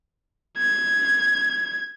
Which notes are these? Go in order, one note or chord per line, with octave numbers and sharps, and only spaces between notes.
G#6